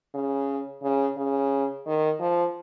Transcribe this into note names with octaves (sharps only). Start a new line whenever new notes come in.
C#3
C#3
C#3
D#3
F3